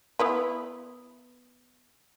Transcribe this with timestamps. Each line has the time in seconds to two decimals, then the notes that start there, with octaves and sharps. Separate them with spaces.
0.19 B3 E4 B4